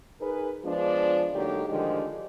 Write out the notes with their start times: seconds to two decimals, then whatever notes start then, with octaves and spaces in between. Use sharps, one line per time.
0.21 D#4 G#4 A#4 B4
0.65 F3 G#3 B3 D4
1.34 D3 F#3 G#3 A#3 D#4 G4
1.68 A2 D3 D#3 F3 G#3 G4